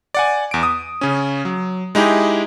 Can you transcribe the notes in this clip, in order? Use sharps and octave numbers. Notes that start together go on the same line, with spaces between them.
D5 F#5 G#5
E2 D7
D#6
C#3 C#4
F#3
G#3 D#4 E4 G4 G#4